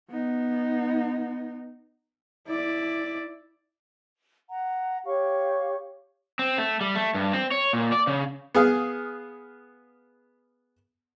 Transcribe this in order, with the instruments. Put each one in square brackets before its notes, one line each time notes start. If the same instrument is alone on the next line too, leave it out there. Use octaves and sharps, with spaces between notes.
[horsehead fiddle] B3 D#4
E4 D5
[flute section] F#5 A#5
G4 C#5 F5 C#6
[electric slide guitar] C4
A3
G3
A3
G2
C4
C#5
A#2
D5
C#3
[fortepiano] B3 G#4 F5